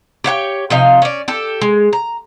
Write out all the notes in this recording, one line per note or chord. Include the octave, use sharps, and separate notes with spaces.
G4 C#5 F#5 G5
C3 F3 D#4 F5
C#4 D5
G4 A4
G#3
A#5